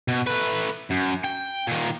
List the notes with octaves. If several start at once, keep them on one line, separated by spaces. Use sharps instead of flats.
B2
A3 B4
F#2
G5
A#2 D#3